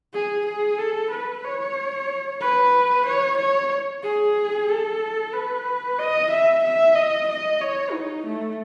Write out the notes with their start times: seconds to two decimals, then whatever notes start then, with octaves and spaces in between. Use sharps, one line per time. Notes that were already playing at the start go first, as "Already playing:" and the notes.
0.13 G#4
0.46 G#4
0.78 A4
1.11 B4
1.44 C#5
2.40 B4
3.06 C#5
3.38 C#5
4.03 G#4
4.69 A4
5.33 B4
5.99 D#5
6.31 E5
6.64 E5
6.95 D#5
7.28 D#5
7.61 C#5
7.93 D#4
8.26 A3